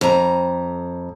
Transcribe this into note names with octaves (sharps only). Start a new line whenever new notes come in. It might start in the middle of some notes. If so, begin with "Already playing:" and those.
F2 A#5